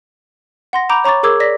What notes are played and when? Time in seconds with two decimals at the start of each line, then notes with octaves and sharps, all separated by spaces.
0.73 F#5 C6 A#6
0.89 A#5 B5 D6 G6 D7 F7
1.04 C#5 A#5 C#6 D6 A6
1.23 G#4 A#4 D6 E6 G#6
1.40 D5 A#6 B6